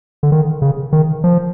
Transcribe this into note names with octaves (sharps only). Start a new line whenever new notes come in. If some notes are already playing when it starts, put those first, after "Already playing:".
D3
D#3
C#3
D#3
F3